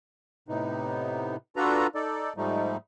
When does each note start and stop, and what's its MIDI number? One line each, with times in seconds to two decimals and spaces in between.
0.48 1.36 45
0.48 1.36 48
0.48 1.36 59
0.48 1.36 63
1.56 1.87 62
1.56 1.87 65
1.56 1.87 66
1.56 1.87 69
1.56 1.87 71
1.56 1.87 82
1.95 2.33 63
1.95 2.33 69
1.95 2.33 74
2.37 2.77 44
2.37 2.77 53
2.37 2.77 55
2.37 2.77 57
2.37 2.77 63